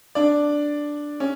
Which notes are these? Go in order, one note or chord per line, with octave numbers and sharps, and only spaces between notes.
D4 D5
C#4